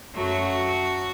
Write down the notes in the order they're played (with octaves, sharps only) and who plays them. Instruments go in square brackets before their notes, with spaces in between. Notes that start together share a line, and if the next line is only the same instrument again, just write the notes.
[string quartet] F#2 F#3 A3 F#4